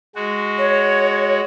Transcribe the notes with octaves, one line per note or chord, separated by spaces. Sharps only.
G#3 F#4
C#5